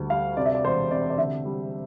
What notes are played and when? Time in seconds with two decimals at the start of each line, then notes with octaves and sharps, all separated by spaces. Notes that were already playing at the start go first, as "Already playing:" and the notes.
Already playing: D2 G3
0.10 G3 F5
0.37 C3 D5
0.46 E5
0.55 D5
0.64 E1 C5
0.91 C3 D5
1.10 D5
1.18 D3 E5
1.45 G3